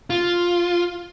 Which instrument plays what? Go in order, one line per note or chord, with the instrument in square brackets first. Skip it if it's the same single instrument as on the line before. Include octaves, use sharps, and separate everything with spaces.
[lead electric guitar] F4